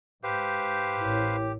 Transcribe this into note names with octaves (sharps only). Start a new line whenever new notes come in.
G#2 G4 B4 C5 F5
A1 E4 A#4 C#5